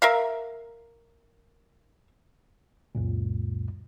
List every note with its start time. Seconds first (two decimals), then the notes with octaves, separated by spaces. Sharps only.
0.02 A#4 E5 F5
2.95 C#2 F#2 A#2